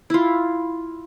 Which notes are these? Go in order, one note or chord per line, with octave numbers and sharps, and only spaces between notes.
E4 F4